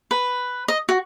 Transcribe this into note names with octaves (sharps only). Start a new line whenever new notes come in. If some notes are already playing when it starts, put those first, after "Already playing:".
B4
D#5
F#4